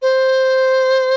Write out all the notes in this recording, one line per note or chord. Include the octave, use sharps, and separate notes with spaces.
C5